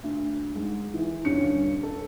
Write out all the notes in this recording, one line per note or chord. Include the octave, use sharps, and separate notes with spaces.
D2
G#2 G#3
E3
D#1 G2 D3 C#4 C#7
A4